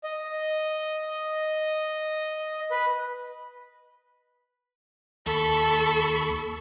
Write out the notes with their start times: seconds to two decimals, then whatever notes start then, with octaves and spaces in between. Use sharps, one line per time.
0.04 D#5
2.71 B4
5.26 D#2 A4 B5 C#6